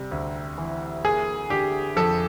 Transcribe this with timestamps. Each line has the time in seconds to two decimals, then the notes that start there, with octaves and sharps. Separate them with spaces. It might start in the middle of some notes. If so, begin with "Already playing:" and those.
Already playing: C3 G3
0.11 D2
0.58 E3
1.05 A#3 G#4
1.50 D3 G4
1.97 F2 A4